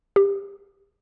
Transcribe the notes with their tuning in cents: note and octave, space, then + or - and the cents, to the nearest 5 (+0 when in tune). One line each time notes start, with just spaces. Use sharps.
G4 +25